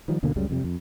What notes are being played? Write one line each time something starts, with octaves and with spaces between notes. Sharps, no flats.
D#3 F3 G3
D2 B2 D3 A#3
C#2 F#2 C#3 G3
F2 C3 G3
F2